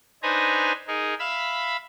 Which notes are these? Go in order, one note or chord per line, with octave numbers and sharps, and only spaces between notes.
D4 D#4 B4 C5 G#5 A#5
D#4 G#4 A#4
E5 F5 B5 E6